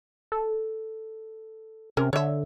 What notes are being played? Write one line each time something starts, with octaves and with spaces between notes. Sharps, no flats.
A4
C3 C#4 A#4
D3 C#5 E5